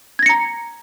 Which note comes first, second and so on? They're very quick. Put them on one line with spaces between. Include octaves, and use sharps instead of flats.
G#6 A#6 C#7 A#5